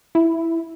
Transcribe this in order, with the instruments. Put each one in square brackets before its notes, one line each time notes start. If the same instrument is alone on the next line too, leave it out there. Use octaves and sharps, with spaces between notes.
[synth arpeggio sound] E4